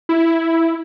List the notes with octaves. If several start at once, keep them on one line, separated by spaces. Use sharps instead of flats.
E4